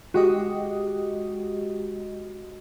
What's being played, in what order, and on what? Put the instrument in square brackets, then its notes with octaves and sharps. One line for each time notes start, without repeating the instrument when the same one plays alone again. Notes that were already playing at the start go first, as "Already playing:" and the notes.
[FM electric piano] G#3 G4 D#5 [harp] F#4